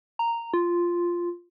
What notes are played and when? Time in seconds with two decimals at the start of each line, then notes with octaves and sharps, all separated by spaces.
0.19 A#5
0.54 F4